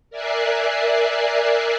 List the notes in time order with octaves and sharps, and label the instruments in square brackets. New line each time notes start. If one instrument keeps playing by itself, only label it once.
[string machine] A#4 D5 E5 G#5 F#6 C7